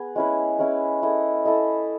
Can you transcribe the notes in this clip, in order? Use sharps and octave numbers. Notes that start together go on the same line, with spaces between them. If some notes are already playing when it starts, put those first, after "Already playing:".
Already playing: B3 G#4
G#3 C#4 E4 B4
G#3 C#4 E4 B4
E4 A4 D#5
E4 A4 D#5